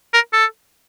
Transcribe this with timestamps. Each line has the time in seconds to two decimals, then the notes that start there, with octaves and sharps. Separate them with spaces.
0.14 A#4
0.33 A4